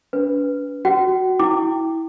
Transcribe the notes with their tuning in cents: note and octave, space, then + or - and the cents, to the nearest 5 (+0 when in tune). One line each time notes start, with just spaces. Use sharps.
D4 -45 B4 +0
F#4 +0 F#5 +45
E4 -20 G5 +0 D6 +0